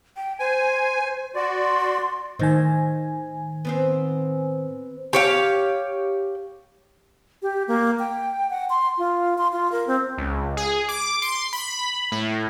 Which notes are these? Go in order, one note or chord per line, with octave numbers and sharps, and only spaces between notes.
G5
C5 G#5
F#4 D5 C6
A2 D#3 D#4 C5 G#5
B3 C4 C5
G4 C#5 F5
G4
A#3
G5
F#5
C6
F4
C6
F4
A#4
C4
C#2
G#4
D6
C6
B5
A2